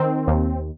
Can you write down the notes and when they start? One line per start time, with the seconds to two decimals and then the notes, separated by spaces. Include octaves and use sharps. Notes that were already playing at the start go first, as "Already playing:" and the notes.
Already playing: D#3 C4
0.27 D#2